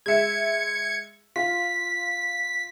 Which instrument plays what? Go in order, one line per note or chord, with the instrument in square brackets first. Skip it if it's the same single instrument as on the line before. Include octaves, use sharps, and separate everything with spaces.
[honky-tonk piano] G#3 E5 [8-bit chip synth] G#6 C#7
[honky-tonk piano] F4 [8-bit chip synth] B6